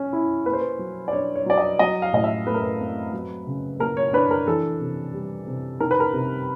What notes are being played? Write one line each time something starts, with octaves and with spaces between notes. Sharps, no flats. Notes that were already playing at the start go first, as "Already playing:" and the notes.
Already playing: C#4
E4
A#3 B4
C5
B4
F#3
D5
D4 C#5
C#5
F#3 D5
D#5
F#3 D#5
F5
A2 D#5
E5
A3 B4
A#4
B4
C4
F#3
C#3
A#3 A#4
C#5
D4 B4
A#4
E3 A4
C3
G3
C3
D#3 A#4
B4
A#4
C3